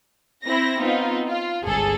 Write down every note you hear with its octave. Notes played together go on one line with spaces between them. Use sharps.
C4 E4 A#6
B3 C4 D#4 F4
F4
G1 C#2 G#4 A4